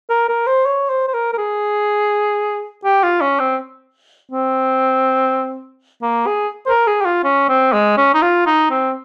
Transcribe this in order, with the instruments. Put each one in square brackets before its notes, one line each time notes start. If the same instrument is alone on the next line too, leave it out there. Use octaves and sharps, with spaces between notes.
[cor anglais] A#4
A#4
C5
C#5
C5
C5
A#4
A#4
G#4
G4
F4
C#4
C4
C4
A#3
G#4
C5
A#4
G#4
G4
F4
C#4
C4
G#3
C#4
D#4
F4
D#4
C4